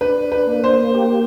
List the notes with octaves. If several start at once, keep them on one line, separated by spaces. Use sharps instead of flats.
D4 B4
B4
A#3
C5
G4